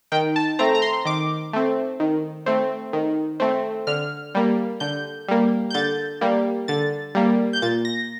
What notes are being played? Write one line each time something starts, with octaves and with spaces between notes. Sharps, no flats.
D#3 G5
A5
A3 C4 A#5
A#5
C6
D#3 D6
A3 C4
D#3
A3 C4
D#3
A3 C4
D3 F6
G3 A#3
D3 G6
G3 A#3
G6
D3 A6
G3 A#3
D3 A6
G3 A#3
G6
A#2 A6
A#6